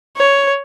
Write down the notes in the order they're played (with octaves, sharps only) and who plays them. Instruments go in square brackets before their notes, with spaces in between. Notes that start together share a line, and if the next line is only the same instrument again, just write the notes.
[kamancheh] C#5